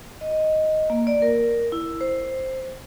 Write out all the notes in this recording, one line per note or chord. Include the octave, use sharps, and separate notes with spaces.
D#5
A#3
D5
A#4
E4
C5